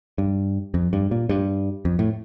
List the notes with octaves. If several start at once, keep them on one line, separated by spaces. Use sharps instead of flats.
G2
F2
G2
A#2
G2
F2
A2